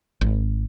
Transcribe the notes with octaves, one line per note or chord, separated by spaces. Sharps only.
G#1